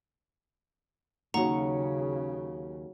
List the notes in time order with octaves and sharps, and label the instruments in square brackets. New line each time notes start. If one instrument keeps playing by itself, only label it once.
[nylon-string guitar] D#2 [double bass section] C#3 [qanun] F#3 C#6 [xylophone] F#5 A#5